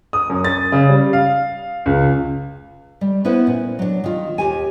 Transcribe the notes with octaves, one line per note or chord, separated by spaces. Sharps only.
D#6
F#2
A6
C#3
G3
F5
C#2
G3
B3 C#4 E4 B4 C5
A#2
F#3 D4
D#3 F4
D#2 G4 G#5